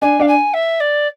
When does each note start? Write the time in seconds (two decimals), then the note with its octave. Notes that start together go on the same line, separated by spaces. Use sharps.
0.02 D4 G#5
0.20 D4 F5
0.28 G#5
0.54 E5
0.80 D5